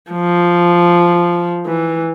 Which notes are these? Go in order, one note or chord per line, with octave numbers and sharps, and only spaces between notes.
F3
E3